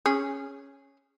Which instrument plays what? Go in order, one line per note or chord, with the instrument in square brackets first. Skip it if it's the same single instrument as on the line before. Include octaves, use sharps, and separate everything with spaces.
[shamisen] C#4 G#4